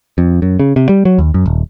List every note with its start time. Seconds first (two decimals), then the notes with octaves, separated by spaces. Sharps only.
0.18 F2
0.42 F#2
0.60 C#3
0.76 C3
0.89 G3
1.05 F#3
1.18 D#2
1.34 F#2
1.46 D#1